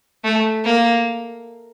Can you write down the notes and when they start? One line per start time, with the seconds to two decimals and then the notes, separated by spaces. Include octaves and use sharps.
0.24 A3
0.64 A#3